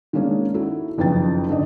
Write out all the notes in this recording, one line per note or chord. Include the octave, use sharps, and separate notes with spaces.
D#3 G#3 A#3 C#4 D4
D#4 E4 F#4 A4
F#1 F2 D#3 B4 G5 A6
G#2 D3 D5 D#5